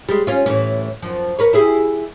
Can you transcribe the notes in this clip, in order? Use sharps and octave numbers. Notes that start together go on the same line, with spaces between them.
G3 G#3
C#4 F4
A2 E3 C#4
F#2 F3
A#4 B4 C#5
E4 G4 G#4